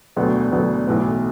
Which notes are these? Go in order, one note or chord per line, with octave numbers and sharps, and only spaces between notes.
E1 D2 D3 F#3 B3
E1 D2 D3 F#3 B3
B1 A2 E3 B3